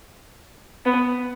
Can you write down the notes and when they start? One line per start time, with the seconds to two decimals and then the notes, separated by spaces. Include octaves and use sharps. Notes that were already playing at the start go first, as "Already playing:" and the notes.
0.86 B3